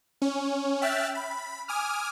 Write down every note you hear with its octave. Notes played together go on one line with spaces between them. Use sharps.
C#4
E5 G5 F6 F#6 A6 B6
B5
G#5 D6 D#6 F6